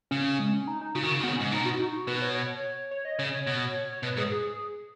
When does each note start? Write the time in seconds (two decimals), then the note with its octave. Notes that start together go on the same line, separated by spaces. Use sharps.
0.11 C#3 C#4
0.39 G#3
0.53 C#4
0.67 D#4
0.81 D#4
0.95 C#3 F#4
1.03 D#3
1.11 C#3
1.20 D#3
1.23 C#3 B3
1.37 G#2 C#4
1.52 B2 D#4
1.66 F#4
1.79 D#4
1.93 F#4
2.07 B2 B4
2.22 C#5
2.35 C#5
2.91 C#5
3.05 D#5
3.19 C#3 C#5
3.33 C#5
3.47 B2
3.93 C#5
4.03 B2 B4
4.17 G#2 G#4
4.32 G#4